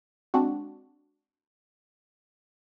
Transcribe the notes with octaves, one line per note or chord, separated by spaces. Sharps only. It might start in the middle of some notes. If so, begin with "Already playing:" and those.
G#3 C4 D4 F#4